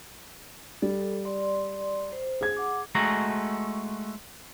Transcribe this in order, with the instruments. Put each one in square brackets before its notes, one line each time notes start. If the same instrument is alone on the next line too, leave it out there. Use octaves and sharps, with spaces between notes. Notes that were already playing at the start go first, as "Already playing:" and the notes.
[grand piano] G3 [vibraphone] A4
[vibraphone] D5 C6
C5
[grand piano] G#4 G#6
[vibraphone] F#5 D6
[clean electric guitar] G#3 A3 F#4 A#5